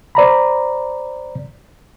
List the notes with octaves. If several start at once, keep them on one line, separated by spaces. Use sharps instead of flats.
C5 D5 A#5 B5